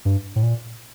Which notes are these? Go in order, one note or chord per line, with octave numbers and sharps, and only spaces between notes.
G2
A2
A#2